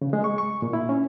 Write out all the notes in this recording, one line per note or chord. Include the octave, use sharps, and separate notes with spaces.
C#3
G#3
C#6
C#6
A#2
E4
C#4